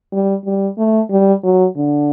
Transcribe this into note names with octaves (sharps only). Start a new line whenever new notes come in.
G3
G3
A3
G3
F#3
D3